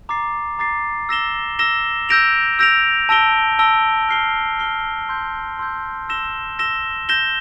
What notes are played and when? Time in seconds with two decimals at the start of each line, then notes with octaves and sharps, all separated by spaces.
0.09 A#5 D6 A6 C7
0.59 A#5 D6 A6 C7
1.09 E6 A#6 E7 G7
1.59 E6 A#6 E7 G7
2.09 E6 G6 A#6 D7 F7
2.59 E6 G6 A#6 D7 F7
3.09 A5 E6 A#6 D7 G7
3.59 A5 E6 A#6 D7 G7
4.09 F6 C7 G7
4.59 F6 C7 G7
5.09 C6 E6 G6
5.59 C6 E6 G6
6.09 E6 A#6 E7 G7
6.59 E6 A#6 E7 G7
7.09 G6 A#6 E7 G7